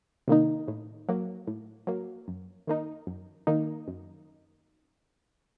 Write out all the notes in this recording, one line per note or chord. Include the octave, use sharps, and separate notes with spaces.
C3 D#3 A#3 D#4
A2
F#3 A#3
A2
F#3 A#3
F#2
D#3 A#3 D#4
F#2
D#3 A#3 D#4
F#2